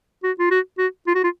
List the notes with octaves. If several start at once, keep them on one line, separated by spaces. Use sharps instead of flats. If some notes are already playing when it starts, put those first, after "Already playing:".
F#4
F4
F#4
F#4
F4
F#4
F4